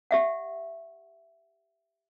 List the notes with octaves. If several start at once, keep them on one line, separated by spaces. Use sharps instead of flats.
G4 E5 F#5